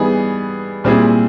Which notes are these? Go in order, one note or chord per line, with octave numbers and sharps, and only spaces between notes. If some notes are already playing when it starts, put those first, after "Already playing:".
Already playing: E3 G3 B3 D#4 G#4
A#2 G3 C4 E4 G#4